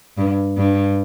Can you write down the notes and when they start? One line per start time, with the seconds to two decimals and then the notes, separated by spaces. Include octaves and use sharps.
0.18 G2
0.58 G2